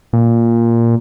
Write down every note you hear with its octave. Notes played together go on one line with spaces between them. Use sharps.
A#2